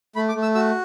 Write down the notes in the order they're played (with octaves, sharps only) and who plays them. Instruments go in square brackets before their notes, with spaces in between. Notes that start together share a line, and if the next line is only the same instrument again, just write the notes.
[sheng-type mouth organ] A3 B5
D6
A3
E6
F#4 E6